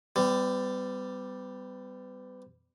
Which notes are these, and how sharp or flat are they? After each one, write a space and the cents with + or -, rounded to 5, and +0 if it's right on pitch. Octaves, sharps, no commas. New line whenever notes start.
G3 +0 B3 +40